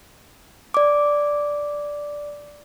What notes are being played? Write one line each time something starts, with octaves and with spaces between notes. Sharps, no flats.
D5 D6